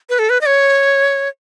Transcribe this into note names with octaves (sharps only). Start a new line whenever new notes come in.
B4
A4
B4
D#5
C#5